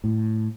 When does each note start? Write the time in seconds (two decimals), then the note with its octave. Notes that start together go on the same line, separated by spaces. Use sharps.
0.04 A2